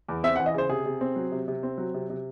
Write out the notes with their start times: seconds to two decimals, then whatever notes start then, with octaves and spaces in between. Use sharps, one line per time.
0.08 E2
0.23 C4 E5
0.36 F#5
0.39 E3
0.46 D#5
0.54 C#3 C5
0.69 C3 G#4
0.86 C3
1.01 C4
1.16 F#3
1.32 C3
1.48 C3
1.63 C4
1.78 F#3
1.94 C3
2.10 C3